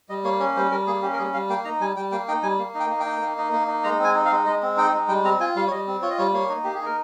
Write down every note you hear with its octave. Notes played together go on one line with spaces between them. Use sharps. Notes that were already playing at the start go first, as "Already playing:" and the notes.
G3 D#5
A#3 C#5
C#4 C#5
G3 C5
G3 A#4
A#3 G#4
C#4 G4
A#4
G3 G#4
G3 F5
A#3 G5
D#4 A#5
G3 G#5
G3 G5
A#3 G5
D#4 G5
G3 G#5
A#3
D#4
G5
A#3
G5
D#4
A#3
D#4
A#3
D#4
G#3 A#5
C4
G#5
D#4
F5
G#3
G#3 D#5
C4
D#4 G5
G#3
G3 G5
C4 A#5
F4 G#5
G3 F5
C#5
G3 D#5
C4
F4 C#5
D#5
G3 C#5
A#3 C#5
D#4
A#3 G4
G#4
D#4 A#4